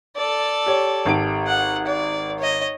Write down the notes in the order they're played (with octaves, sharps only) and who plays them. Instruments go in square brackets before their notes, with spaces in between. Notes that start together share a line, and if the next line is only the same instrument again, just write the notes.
[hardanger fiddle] A4 D5
[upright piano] G4 C#5
G#1 G4 D7
[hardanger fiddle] F#5
D5
C#5 D#5